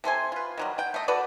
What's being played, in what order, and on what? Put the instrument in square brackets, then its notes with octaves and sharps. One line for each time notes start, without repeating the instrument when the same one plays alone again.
[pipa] C3 A4 C5 G#5
F4 B4
D#3 F#3 G3
F#5 G5
A3 D#5
F#4 A4 B4 D5